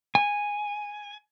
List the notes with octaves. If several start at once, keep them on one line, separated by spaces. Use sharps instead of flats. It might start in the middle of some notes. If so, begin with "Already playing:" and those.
G#5